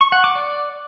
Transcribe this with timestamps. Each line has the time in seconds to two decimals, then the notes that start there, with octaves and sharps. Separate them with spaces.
0.01 C#6
0.12 F#5
0.24 D6
0.35 D5